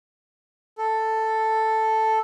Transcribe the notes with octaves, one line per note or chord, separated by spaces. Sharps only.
A4